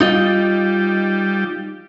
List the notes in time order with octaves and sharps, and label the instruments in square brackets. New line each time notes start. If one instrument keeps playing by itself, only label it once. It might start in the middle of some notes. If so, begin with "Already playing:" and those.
[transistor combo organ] G3 [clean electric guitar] D#4 F4 D#5